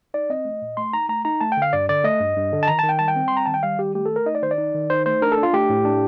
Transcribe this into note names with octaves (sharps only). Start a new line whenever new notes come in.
D#4 D5
C4 D#5
A3
A#2
A3 C6
D#4 A#5
A3 A#5
D#4 A#5
A3 A5
G5
D3 F5
G2 D5
D3 D5
A3 D#5
G2
G2
D3
A5
D#3 A#5
D#3 A5
G5
G3 A5
G5
C4
G3 C6
A#5
D#3 A5
G5
G3 F5
D#3 G4
A3 G4
A4
A3
A#4
D#4 D#5
D5
D#3 C5
D5
D#4
D#3
D#4 C5
A3 C5
D4 A#4
A4
D4
F4
A3 G4
A2
D4